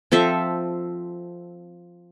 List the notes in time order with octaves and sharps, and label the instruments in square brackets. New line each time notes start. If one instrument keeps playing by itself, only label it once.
[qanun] F3 C4 A4 E5